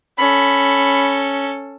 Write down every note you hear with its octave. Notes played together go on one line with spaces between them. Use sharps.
C#4 A4 B5